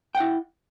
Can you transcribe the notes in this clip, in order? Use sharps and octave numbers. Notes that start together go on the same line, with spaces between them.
E4 F#5 G5